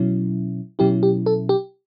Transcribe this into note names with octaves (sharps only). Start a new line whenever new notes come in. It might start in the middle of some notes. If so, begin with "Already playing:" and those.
Already playing: B2 F#3 C#4 E4
B2 F#3 C#4 E4 G4
G4
A4
G4